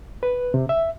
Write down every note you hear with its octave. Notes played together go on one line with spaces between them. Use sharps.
B4
C3
E5